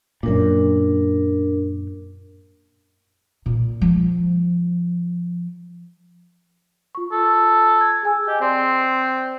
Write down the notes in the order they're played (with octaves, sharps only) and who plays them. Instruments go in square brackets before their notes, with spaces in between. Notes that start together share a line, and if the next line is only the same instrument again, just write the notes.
[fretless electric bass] F#2 A#2 [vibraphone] D4 A#4
[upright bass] A#2
F3
[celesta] F4 C#6
[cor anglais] A4
[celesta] G#6
G#4 G#5 E6
[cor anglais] G4 [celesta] D#5
[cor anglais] C4 [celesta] D5 G5 C6